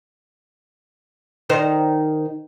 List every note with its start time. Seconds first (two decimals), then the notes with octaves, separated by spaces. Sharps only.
1.49 D#3 D#4 C5